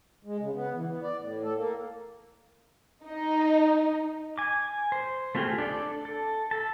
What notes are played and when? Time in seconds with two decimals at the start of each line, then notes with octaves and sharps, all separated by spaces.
0.25 G#3
0.40 C#3
0.53 B3
0.74 E3
0.89 B3
1.03 D5
1.19 A2
1.43 A4
1.55 A#3
3.07 D#4
4.38 G#5 D6
4.92 C5
5.35 A3 C4 F4 G4 G#4
5.58 D4 A4 D5
6.05 A4
6.51 A4 A5